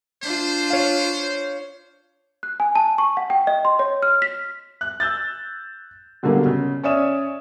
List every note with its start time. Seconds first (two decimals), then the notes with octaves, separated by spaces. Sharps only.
0.23 D4 F4 C5
0.70 C#5 F5
2.43 F#6
2.60 G#5
2.75 A5
2.98 C#6
3.17 F#5
3.30 G5
3.47 D#5
3.65 C6
3.79 C#5
4.02 F6
4.22 B6
4.81 F#6
5.00 E6 G6 A6
6.23 B2 D3 F#3 G3 A#3
6.46 C#3
6.83 C#4 C#5 D5 E5 D#6 E7